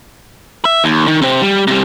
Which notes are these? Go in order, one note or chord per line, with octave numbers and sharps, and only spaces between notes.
E5
D#2
D#3
C3 C4
G3
C3 G3